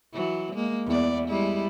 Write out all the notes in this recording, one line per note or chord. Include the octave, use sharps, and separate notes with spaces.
E3 F#3
G#3 A#3
E2 D5
G3 G#3 E4